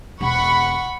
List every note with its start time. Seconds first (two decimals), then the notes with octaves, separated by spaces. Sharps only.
0.21 E1 F#5 B5 C#6